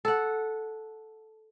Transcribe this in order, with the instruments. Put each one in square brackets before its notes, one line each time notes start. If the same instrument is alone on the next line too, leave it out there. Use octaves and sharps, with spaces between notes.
[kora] A4 F#5